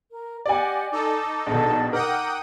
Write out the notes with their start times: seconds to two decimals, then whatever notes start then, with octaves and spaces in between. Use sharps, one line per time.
0.11 A#4
0.46 G4 D5 D#5 F#5 G#5
0.92 D#4 A4 A5 D6
1.47 A#1 B2 A5
1.92 D#4 A#4 F#5 G5 A#5 D6 D#6